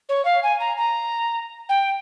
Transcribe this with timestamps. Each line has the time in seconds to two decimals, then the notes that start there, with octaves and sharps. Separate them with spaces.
0.09 C#5
0.25 F5
0.43 G#5
0.60 A#5
0.77 A#5
1.69 G5